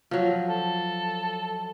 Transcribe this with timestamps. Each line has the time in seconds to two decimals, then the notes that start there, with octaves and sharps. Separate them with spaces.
0.11 F3 F#3
0.48 A4